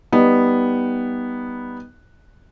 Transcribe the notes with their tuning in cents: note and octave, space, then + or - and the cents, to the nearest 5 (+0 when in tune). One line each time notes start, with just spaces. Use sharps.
G3 +0 B3 -5 D#4 +0